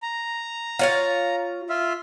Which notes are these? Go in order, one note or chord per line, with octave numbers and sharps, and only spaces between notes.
A#5
F4 C#5 F5
F4 E5 F5